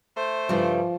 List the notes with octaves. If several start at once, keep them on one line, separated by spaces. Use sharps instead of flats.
A3 C5
G2 C#3 F3 G3